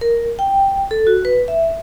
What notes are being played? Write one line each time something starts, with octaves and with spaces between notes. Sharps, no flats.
A#4
G5
A4
F#4
B4
E5